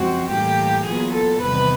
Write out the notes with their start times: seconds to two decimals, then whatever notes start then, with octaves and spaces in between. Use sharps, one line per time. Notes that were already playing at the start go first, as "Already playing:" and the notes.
Already playing: F#2 C#3 F3 G#3 C4 F#4
0.29 A2 E3 G3 A#3 G4
0.86 A#2 F#3 B3 G#4
1.14 A4
1.42 E2 C3 D#3 G3 B3 B4